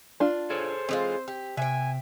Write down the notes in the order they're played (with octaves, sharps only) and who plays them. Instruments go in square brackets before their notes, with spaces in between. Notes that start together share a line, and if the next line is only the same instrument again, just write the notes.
[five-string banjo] D4 F4
[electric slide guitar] G#4 A4 C#5 [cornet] C5
[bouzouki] E3 G#3 F4 [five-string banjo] C4
[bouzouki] G4
[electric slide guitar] C3 [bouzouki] E5 G5 [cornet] G#5